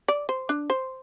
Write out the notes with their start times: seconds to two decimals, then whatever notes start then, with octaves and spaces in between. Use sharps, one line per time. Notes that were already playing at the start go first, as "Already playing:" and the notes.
0.08 D5
0.29 C5
0.49 D4
0.70 C5